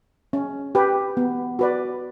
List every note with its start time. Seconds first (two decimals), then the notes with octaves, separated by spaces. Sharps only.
0.33 C#4
0.75 G4 B4
1.17 B3
1.59 F#4 B4 D5